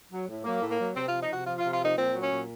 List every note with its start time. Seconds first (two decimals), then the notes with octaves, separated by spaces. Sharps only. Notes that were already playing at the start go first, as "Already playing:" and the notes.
0.10 F#3
0.28 A2
0.44 F#3 A#3
0.61 A2
0.69 A#3
0.78 F#3
0.95 C3 C4
1.08 F3 F4
1.21 D#4
1.29 C3 F#4
1.46 F3 F4
1.59 F4
1.63 C3
1.72 F4
1.80 F3 D#4
1.96 A#2 C4
2.14 F#3
2.22 C#4
2.31 A#2